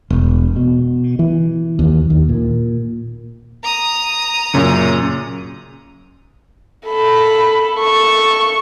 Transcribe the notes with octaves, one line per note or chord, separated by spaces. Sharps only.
E1
B2
E3
D#2
D#2
A#2
A#5 D#6
F#2 A#2 C#3
A4 B5
A4 C#6